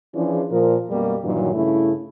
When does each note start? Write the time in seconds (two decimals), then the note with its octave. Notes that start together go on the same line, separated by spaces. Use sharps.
0.14 E3 F3 C#4 D4 G#4
0.51 A#2 F3 A#4
0.90 F#2 B2 G3 A#3 G4 A#4
1.24 G2 A#2 D#3 E3 F#3
1.54 G2 C#3 A3 E4